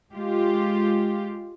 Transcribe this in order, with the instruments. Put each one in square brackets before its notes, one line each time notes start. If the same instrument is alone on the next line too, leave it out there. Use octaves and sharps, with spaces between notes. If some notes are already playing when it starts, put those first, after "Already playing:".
[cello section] G#3 F4 G4